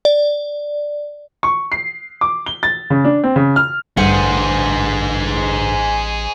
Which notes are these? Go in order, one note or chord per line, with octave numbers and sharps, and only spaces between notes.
D5
C#6
C7
D6
G7
A6
C#3
D4
C4
C#3
F6
A1 D2 G2 G#4 C5 F#5